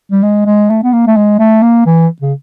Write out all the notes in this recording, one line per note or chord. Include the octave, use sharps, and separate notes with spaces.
G3
G#3
G#3
A3
B3
A#3
A3
G#3
A3
A#3
E3
C#3